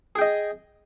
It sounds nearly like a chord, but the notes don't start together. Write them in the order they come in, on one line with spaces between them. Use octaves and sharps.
G#4 G5 D#5